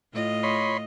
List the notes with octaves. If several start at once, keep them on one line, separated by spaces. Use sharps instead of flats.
A2 F4 D#5
C#5 B5 C6